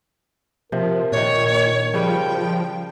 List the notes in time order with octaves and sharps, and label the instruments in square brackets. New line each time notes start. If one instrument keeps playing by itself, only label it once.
[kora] C3 [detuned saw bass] F3 [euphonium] A#4
[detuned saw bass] A#2 [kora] D#3 D4 [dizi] C#5
[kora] C#3 G3 B4 [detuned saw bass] F3 [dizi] G5